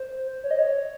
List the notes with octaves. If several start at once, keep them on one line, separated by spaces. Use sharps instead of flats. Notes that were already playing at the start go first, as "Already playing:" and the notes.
Already playing: C5
C#5
D#5
C#5